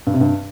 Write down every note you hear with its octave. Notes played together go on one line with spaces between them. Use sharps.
G2
C3
G2